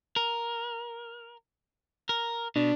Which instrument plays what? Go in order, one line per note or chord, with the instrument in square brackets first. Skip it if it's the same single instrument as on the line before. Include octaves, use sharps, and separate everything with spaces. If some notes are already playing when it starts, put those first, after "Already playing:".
[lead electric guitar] A#4
A#4
[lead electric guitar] B2 [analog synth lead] D4